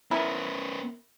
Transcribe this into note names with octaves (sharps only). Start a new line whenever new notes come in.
B3 C#4 E4 A#4